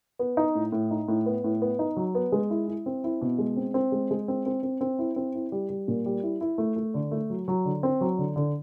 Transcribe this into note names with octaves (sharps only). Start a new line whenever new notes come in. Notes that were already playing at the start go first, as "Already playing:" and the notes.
B3
D#4
A2
A2
D#4
A2
B3
A2
B3
D#4
F#3
B3
G#3
E4
E4
C4
E4
B2
G#3
C4
C4
G#3
G#3
C4
C4
C4
C4
E4
C4
E4
G3
G3
A#2
G3
E4
E4
A3
A3
D3
A3
F#3
F#3
D3
C4
F#3
D3
D3